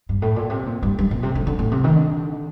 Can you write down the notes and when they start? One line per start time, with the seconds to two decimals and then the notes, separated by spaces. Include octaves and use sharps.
0.09 G2
0.22 A2
0.36 A#2
0.50 C3
0.66 A#2
0.83 G2
0.99 G2
1.11 A#2
1.23 C3
1.35 D3
1.47 D3
1.59 A2
1.72 C3
1.84 D#3
1.96 D3